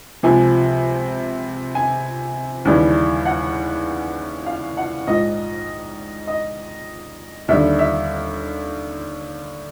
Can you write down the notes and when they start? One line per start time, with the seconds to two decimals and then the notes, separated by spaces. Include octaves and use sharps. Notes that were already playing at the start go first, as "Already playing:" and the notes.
0.23 C#2 C3 F3 G#5
1.75 G#5
2.65 D#2 C#3 E3 G3
3.25 F#5
4.46 F5
4.77 F#5
5.07 A#1 G#2 F3 D#5
6.28 D#5
7.48 D#2 D3 G3 E5
7.79 E5